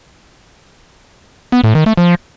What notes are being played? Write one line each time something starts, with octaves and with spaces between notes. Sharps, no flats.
B3
A2
D#3
A3
F3